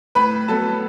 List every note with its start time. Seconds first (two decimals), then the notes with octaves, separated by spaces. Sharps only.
0.15 A2 B4 B5
0.48 F#3 B3 A4 A5